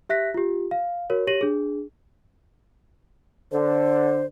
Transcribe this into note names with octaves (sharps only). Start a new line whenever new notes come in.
G4 E5 F#6 A#6 B6
F4 G4
F5
F#4 A#4 C#5
G4 C#5 A#6 D#7 F#7
D4 G#4
D3 C5